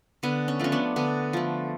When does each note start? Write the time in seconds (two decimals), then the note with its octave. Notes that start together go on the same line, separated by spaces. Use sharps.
0.23 D3 B3
0.48 C#4
0.59 F3 A3 C#4
0.72 B3 D4
0.96 D3 B3
1.33 F3 A3